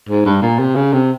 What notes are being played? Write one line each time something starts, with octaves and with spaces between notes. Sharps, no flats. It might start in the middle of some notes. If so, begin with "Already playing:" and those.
G#2
G2
A#2
C3
C#3
C3